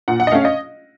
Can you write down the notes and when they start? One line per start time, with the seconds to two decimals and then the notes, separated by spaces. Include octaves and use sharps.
0.08 A#2 F#5
0.20 F#5
0.27 D#5
0.32 A3 C#4 F5
0.45 D#5